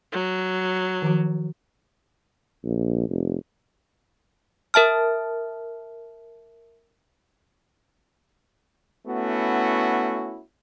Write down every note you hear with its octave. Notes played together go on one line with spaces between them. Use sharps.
F#3
D#3 F3 F#4
A#1
F1
A#4 E5 A5 F6
A3 B3 C#4 E4 F#4